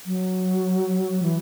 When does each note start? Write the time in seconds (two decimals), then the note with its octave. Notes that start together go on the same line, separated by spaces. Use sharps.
0.06 F#3
1.23 E3